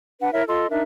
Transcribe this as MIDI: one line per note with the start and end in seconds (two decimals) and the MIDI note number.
0.21 0.30 62
0.21 0.30 71
0.21 0.30 78
0.33 0.43 64
0.33 0.43 70
0.33 0.43 73
0.33 0.43 76
0.48 0.66 65
0.48 0.66 69
0.48 0.66 75
0.48 0.66 84
0.70 0.82 62
0.70 0.82 63
0.70 0.82 70
0.70 0.82 76